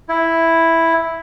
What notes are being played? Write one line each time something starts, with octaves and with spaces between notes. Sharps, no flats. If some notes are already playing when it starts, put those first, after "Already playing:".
E4